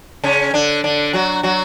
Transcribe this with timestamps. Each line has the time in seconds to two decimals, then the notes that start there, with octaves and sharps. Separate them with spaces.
0.24 C#3 C#4
0.54 D3 D4
0.84 D3 D4
1.13 F#3 F#4
1.43 F#3 F#4